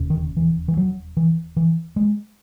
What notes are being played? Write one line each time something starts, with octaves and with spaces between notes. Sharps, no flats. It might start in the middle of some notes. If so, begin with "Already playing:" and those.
Already playing: E1 D#2 C#3
D#3
E3
E3
F#3
E3
E3
G#3